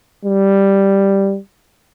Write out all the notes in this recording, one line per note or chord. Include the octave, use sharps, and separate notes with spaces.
G3